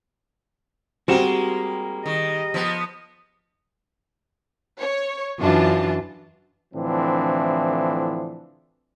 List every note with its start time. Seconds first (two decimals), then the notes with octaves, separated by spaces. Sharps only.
1.08 G3 G#3 A#3 C4 F#4 A#4 E7
2.06 D#3 D#5
2.54 F3 B3
4.79 C#5
5.40 F#2 E3 D4 F4 A5
6.74 A2 D3 E3 F3 C4 D4